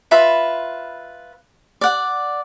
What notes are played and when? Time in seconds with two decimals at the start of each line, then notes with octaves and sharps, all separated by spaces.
0.11 F4 B4 E5 B5
1.81 D5 F#5